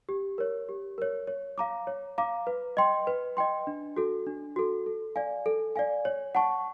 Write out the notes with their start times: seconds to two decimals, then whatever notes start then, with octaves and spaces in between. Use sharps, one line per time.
0.09 G4
0.38 A#4 C#5
0.69 G4
0.98 A#4 C#5
1.27 C#5
1.58 F5 A#5 D6
1.87 C#5
2.18 F5 A#5 D6
2.47 B4
2.77 D#5 G5 C6
3.07 B4
3.37 D#5 G5 C6
3.67 D4
3.97 F#4 A4
4.27 D4
4.56 F#4 A4
4.86 A4
5.16 D5 F5 G#5
5.46 A4
5.76 D5 F5 G#5
6.05 C#5
6.35 F#5 A5 C#6